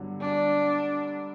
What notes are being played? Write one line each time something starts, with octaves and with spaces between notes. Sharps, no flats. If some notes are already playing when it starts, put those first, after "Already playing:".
Already playing: G2 D3 F#3 B3
D4